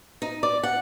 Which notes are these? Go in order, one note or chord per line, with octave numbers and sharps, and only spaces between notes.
D#4
D5
F#5